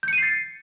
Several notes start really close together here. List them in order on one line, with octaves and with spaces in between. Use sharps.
G6 C#7 D#7 C7 A6